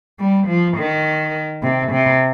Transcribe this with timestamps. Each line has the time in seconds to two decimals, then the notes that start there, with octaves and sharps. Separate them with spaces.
0.19 G3
0.47 F3
0.77 D#3
1.63 C3
1.92 C3